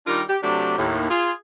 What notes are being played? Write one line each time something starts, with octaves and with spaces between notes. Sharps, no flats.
D#3 G3 D4 F4 G4 A#4
G4
C3 F#3 A3 D4 G4
D#2 A2
F4 G#4